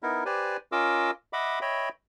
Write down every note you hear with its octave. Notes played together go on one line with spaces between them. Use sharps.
B3 D#4 E4 A#4
G4 B4 C5 D5 G#5
C#4 F4 A#4 D#5 D6 E6
D#5 E5 F#5 B5 D6
C#5 D#5 E5 G5 B5